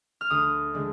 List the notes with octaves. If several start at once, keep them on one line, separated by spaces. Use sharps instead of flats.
F6
D2 D#6
D3 G#3 D4